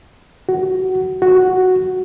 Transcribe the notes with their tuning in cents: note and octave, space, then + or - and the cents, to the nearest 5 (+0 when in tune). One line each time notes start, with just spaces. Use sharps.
F#4 +15
F#4 +0